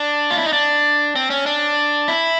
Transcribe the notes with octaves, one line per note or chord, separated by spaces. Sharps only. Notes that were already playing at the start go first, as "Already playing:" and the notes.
Already playing: D4
F4
E4
D#4
D4
C4
C#4
D4
E4